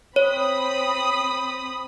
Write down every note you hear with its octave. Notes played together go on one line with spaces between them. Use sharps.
C4 C#5 B5 D#6